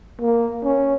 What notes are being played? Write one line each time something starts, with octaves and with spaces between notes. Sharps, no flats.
A#3
C#4